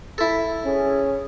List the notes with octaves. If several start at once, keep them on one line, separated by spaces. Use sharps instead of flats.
E4 A4
C#4 G#4